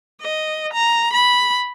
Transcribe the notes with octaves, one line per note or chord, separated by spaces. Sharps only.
D#5
A#5
B5